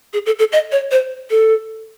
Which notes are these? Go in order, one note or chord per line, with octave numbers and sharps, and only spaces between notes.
G#4
A4
A4
D#5
C#5
C5
A4